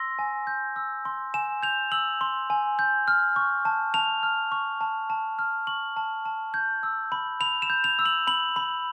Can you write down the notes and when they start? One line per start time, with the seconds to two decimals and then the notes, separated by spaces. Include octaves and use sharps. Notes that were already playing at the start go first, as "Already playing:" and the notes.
Already playing: C6 E6 A#6
0.19 G#5
0.47 G6
0.76 E6
1.05 C6
1.34 G#5 E7
1.63 G6 F7
1.92 E6 F#7
2.21 C6
2.50 G#5
2.79 G6
3.08 F6
3.36 C#6
3.65 A5
3.94 A5 F7
4.23 F6
4.52 C#6
4.81 A5
5.10 A5
5.39 F6
5.67 C#6 F#7
5.96 A5
6.25 A5
6.54 G6
6.83 E6
7.12 B5
7.40 B5 F7
7.62 E7
7.70 G6
7.84 F7
7.99 E6
8.06 F#7
8.27 B5 F#7
8.56 B5